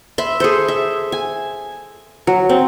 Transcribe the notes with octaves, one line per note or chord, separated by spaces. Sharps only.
E5 B5 C6
G#4 A4 C5
E5
G#5
F#3
C4